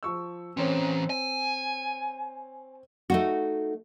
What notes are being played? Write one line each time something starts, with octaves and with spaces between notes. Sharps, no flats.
F3 C#6 E6
E3 C4 C#4 C#5
G#5
A3 D#4 F#4